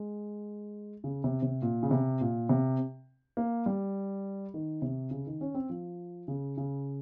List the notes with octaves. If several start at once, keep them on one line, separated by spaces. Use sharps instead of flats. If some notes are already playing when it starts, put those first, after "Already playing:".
Already playing: G#3
C#3
C3
C3
A#2
C#3
C3
A#2
C3
A#3
G3
D#3
C3
C#3
D#3
C#4
C4
F3
C#3
C#3